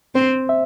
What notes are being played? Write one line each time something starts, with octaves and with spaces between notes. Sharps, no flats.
C4 C5
E5